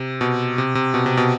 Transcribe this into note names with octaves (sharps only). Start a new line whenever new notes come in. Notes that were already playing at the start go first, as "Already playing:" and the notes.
Already playing: C3
B2
C3
C3
B2
C3
B2